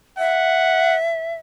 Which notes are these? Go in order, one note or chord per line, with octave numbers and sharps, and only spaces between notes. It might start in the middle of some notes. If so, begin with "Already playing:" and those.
E5 F#5